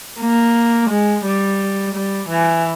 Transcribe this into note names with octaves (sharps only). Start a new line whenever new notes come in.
A#3
G#3
G3
G3
E3